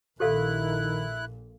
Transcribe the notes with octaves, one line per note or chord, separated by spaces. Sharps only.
A#1 A#2 D#3 E4 G4 A4 F5 F#6